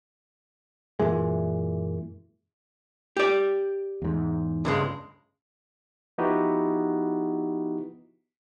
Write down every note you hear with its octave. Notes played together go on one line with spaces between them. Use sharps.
F#2 A#2 E3 G#3
G4 D5
E2 G#2
C#2 G2 G#3
F3 B3 D#4 E4 F#4 G4